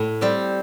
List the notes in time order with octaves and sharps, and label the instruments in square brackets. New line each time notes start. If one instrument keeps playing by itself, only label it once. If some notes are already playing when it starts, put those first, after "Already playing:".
Already playing: [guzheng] A2
G3 C4 G4